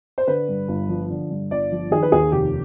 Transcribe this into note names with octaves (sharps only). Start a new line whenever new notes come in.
C5
D3 B4
G2
G1
F3
D3
G2
G1 D5
F3
D#3 G#4
B4
D#2 G#4
F1 G4